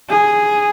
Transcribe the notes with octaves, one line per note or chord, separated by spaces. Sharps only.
G#4